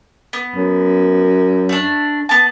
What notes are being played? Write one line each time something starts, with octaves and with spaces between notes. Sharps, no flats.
B3
F#2
A3 D4
B3 A5